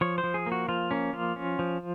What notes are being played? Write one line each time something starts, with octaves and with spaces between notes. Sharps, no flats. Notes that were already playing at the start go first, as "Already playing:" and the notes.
F3 C#5
C5
F3
G#4
A#3
F#4
F3 F4
A#3 C#4
F3 F4
C#4
F3